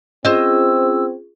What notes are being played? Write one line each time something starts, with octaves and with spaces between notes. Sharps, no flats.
C4 C#4 F4 G#4 C5 D#5 E6